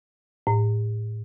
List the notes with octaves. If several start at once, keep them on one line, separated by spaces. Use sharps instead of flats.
A2